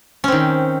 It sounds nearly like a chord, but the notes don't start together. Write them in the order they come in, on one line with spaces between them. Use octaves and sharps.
C#4 C4 D#3